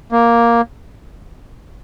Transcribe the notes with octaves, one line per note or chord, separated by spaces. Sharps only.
A#3